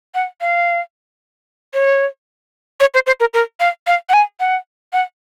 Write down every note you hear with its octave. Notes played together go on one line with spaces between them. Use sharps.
F#5
F5
C#5
C#5
C5
C5
A#4
A#4
F5
F5
F#5
G#5
F#5
F#5